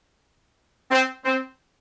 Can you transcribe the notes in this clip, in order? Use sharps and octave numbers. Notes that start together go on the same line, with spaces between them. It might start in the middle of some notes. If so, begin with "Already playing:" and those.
C4
C4